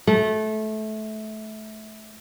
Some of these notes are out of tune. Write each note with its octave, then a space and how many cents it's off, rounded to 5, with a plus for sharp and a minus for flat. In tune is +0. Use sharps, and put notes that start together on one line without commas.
A3 -20